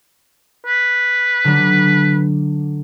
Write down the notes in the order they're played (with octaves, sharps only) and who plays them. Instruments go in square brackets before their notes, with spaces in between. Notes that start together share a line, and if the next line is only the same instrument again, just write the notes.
[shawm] B4
[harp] D3 F#3 D4